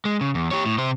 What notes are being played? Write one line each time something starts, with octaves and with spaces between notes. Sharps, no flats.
G#3
C#3
E2
G4 C#5
A2
C3 C5